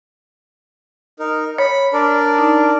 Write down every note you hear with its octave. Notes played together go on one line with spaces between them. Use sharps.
D#4 A#4
C#5 B5
D4 A#4 D5
D#4